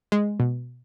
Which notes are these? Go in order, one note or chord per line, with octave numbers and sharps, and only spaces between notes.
G#3
B2